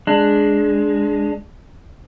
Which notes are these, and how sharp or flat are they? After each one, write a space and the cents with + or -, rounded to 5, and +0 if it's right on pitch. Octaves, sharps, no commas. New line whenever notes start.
G#3 +0 D4 +0